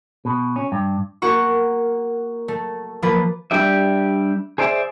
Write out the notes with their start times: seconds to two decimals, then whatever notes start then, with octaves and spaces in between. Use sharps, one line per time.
0.25 B2
0.56 C#4
0.72 G2
1.22 A#3 F#4 C#6
2.48 A3
3.02 F3 A#3 B4
3.51 G3 D4 G4 D5 E5
4.58 G#4 C5 D5 E5